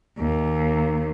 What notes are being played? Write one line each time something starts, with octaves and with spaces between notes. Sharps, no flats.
D#2